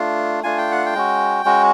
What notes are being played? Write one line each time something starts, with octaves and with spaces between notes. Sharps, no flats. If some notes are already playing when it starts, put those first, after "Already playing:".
Already playing: A3 D4 F4
A3 D4 F4 G#5
G5
F#5
G5
G#3 C#4 F#4
G#3 C#4 F#4